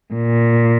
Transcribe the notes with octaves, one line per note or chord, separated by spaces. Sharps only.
A#2